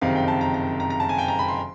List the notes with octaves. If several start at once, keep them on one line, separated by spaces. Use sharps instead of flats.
F#1 F2 C3 D#3 F5
G5
A5
A#5
A#5
A#5
A#5
A5
G#5
G5
A#5
B5
C6